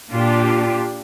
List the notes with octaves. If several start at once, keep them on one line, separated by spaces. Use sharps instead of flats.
A#2 D4 F4 G4